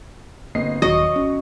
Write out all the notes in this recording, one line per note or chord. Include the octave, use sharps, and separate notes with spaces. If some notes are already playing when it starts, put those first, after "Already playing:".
G1 A#3 C4 D#5 C7
D#1 D#3 F#3 D#5 C#6
G1 C#4